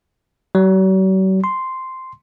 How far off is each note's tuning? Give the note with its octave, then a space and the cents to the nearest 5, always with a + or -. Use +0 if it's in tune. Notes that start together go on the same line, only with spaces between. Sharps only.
F#3 +45
C6 -5